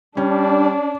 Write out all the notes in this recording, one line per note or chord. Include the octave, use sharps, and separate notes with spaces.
G3 C#4 D4